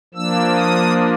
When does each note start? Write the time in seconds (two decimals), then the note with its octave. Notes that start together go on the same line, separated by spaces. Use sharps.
0.14 F3 A#3 D4 E6
0.56 D#6